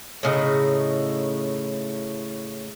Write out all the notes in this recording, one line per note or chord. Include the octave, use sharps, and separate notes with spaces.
A2 C#3 D#4